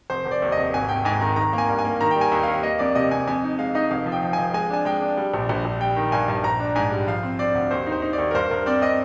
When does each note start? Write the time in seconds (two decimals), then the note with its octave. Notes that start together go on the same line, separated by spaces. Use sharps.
0.10 F1 C5
0.26 F1
0.31 D5
0.42 D#2
0.52 D#5
0.58 F1
0.73 G#1 G#5
0.89 G#1 G5
1.05 G#2 G#5
1.21 D#3 A#5
1.36 D#3 A#5
1.53 A#3
1.58 G#5
1.68 G2
1.79 G#5
1.85 A#3
2.01 D#3 A#5
2.11 G3 G5
2.21 G#5
2.32 D#2
2.43 D#2 F5
2.63 A#3 D#5
2.79 F2 D5
2.95 C3 D#5
3.11 F2 G#5
3.27 F2 G#5
3.44 D#4
3.59 G#3 F5
3.75 D#4 D#5
3.91 F1 F5
4.06 F3
4.12 G5
4.22 F3
4.33 F3 G#5
4.54 G#3 G#5
4.70 D4 G#5
4.85 G#3 G5
5.02 D4
5.17 G3
5.34 A#1
5.49 A#1
5.65 A#1
5.80 G3 G5
5.96 D#3
6.12 G2 G#5
6.28 G2
6.44 A#1 A#5
6.60 D4
6.75 G#2 G#5
6.92 G3
7.07 F3 F5
7.23 C4
7.39 C4 D5
7.55 D2
7.71 D#2 C5
7.87 D#4
7.92 C5
8.02 D#4
8.13 D5
8.18 D#2
8.31 A#4
8.34 G2 C5
8.50 G2 A#4
8.66 C4 D5
8.81 C4 D#5